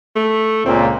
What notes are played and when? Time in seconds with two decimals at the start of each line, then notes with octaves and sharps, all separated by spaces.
0.16 A3
0.66 C#2 A#2 C4